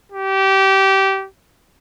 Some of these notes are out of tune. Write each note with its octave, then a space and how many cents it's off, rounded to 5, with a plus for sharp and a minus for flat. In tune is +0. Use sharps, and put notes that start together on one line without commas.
G4 -20